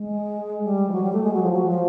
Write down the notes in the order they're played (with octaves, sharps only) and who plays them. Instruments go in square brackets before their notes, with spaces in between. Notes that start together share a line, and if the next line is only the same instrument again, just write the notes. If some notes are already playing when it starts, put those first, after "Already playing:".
Already playing: [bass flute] G#3
G3
F3
F#3
G3
A3
G#3
F#3
F3
F#3
F3